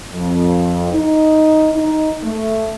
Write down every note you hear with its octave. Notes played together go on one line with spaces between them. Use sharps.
F2
D#4
D#4
A3